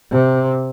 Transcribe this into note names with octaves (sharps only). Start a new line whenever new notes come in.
C3